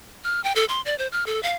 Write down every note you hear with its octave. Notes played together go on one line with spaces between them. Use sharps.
F6
G5
A4
C6
D5
C5
F6
A4
F5